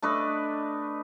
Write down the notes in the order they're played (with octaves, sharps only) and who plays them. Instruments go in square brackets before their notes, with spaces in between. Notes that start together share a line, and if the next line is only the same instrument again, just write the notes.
[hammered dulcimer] A3 D4 B4 D#5